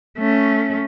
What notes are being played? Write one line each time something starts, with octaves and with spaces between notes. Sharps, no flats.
A3 C#4